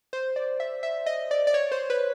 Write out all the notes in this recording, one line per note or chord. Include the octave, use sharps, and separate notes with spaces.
C5
D5
E5
E5
D#5
D5
D5
C#5
C5
B4